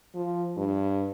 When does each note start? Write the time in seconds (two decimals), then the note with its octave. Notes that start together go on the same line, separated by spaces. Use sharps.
0.15 F3
0.57 G2